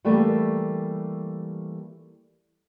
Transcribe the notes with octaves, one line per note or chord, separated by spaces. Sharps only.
E3 G3 A3 A#3 G4